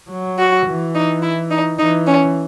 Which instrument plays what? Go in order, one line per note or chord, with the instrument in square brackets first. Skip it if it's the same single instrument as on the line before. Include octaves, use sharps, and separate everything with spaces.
[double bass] F#3
[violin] F#4
[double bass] E3
[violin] D#4
E4
D#4
[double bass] E3 [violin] D#4
[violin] C#4